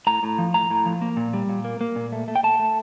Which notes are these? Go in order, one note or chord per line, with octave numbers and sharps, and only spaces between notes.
A2 A#5
A2
F3
A2 A#5
A2
F3
A#3
A#2
G3
A#2
A#3
A#3
A#2
A3
A3
G5
A3 A5
A3